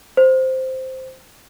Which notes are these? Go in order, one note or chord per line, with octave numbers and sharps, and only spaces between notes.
C5